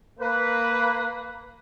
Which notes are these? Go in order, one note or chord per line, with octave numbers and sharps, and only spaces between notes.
A#3 B4